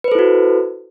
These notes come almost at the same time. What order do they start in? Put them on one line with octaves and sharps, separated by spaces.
B4 C5 A4 E4 F#4